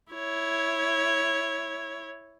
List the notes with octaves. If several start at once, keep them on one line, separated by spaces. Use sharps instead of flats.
E4 C#5